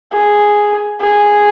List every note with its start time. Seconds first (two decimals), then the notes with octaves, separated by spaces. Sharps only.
0.12 G#4
1.00 G#4